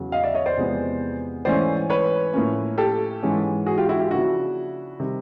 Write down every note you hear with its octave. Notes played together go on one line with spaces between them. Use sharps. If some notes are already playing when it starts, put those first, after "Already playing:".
Already playing: E2 C#3 F#3
D#5 F5
D5 E5
C#5 D#5
C5 D5
E2 C3 F3 G#3 B3
G#2 E3 A3 C#4 C5 D5
B4 C#5
A2 F3 A#3 C#4
G4 A4
G#2 E3 G#3 C#4
F#4 G#4
F4 G4
E4 F#4
F4 G4
C#3 F3 A#3 D4 E4 F#4
C3 D#3 G3